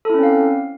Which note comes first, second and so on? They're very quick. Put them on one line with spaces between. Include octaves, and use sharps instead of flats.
A4 E4 C#4 C4 F5